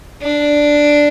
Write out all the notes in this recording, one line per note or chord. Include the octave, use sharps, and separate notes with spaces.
D4